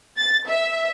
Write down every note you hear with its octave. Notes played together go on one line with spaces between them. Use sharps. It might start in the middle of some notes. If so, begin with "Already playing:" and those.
A6
E5